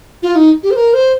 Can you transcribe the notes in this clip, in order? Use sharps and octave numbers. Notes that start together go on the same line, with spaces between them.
F4
D#4
G4
C5
A#4
C5